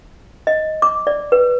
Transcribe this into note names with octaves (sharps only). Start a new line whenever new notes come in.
D#5
D6
D5
B4